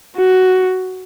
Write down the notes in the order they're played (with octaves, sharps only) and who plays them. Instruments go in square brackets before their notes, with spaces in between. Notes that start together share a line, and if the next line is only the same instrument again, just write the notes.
[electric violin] F#4